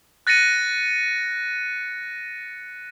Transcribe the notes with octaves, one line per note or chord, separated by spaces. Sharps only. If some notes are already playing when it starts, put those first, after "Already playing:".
F#6 A6 A#6 C#7 D#7